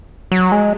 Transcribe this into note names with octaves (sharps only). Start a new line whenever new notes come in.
F#3
G#3